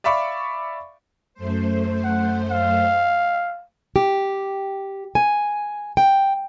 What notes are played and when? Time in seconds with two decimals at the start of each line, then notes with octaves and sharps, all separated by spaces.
0.04 D5 E5 F5 B5 C#6 D6
1.34 F#2 A3 C5
2.04 F#5
2.51 F5
3.96 G4
5.15 G#5
5.97 G5